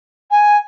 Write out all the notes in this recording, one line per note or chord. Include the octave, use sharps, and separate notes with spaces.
G#5